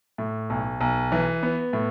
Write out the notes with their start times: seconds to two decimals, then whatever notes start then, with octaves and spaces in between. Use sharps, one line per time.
0.18 A2
0.50 B1
0.81 B1
1.12 E3
1.43 B3
1.73 A2